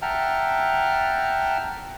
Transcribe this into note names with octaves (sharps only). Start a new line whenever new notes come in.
E5 F#5 G5 A5 A#5 F6